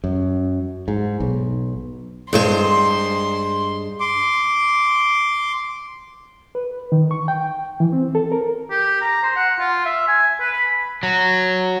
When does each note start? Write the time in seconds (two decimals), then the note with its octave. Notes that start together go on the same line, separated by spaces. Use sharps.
0.04 F#2
0.88 G#2
1.20 B1
2.33 G2 G#3 C5 C6
4.00 C6 D6
6.55 B4
6.92 D#3
7.11 C#6
7.28 G5
7.80 E3
7.93 C4
8.15 A4
8.32 A#4
8.71 G4
9.01 A#5
9.23 C5
9.36 F#5
9.59 F4
9.86 E5
10.08 G#5
10.40 B4
10.53 B5
11.03 F#3